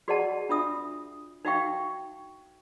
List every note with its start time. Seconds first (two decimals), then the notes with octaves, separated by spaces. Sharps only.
0.08 F#4 G#4 D5 D#5 F#5 A5
0.49 D4 F4 E5 D#6
1.45 D#4 F#4 E5 F5 G5 C#6